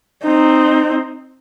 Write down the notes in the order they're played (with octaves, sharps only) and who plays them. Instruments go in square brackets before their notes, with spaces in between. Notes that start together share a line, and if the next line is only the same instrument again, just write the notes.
[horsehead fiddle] C4 D#4